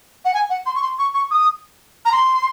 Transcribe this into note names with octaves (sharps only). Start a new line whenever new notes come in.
F#5
G#5
F#5
C6
C#6
C6
C#6
C#6
D#6
A#5
C6